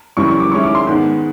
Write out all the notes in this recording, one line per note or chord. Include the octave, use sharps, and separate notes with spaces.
F#2 C#3 E3 G3 C#6
C#6
D6
D#3 G#3 C#4 E4 C#6
D6
C6
G#2 D#3 G#3 B3